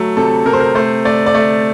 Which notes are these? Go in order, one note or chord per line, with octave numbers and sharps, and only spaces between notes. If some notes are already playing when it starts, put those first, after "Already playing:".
Already playing: F#3 A3
C3 A4
C3 A#4
C5
A#4
A3 C5
A3 D5
D5
A3